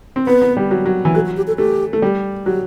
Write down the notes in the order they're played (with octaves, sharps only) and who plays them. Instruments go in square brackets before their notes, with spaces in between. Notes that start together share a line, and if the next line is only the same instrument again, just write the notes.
[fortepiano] C4
[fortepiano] B3 [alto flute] B4
[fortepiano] B3
G3
F#3
F#3
E3
[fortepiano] F#3 [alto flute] A4
[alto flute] F#4
G4
A4
[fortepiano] A3 [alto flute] G4
[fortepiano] A3
G3
[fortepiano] F#3 [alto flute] G4